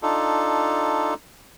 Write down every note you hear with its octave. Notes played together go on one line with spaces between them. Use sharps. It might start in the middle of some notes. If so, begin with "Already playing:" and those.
D4 D#4 F4 A4